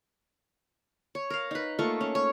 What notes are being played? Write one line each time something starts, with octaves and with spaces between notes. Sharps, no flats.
C#5
A#4 F5
D#4 B4
A3 A#3 F4 C#6
C#4
C#5